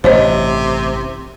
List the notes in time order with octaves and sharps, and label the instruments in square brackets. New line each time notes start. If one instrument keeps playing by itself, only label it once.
[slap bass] A1 G2 [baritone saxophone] C3 [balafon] C5 C#5 D#5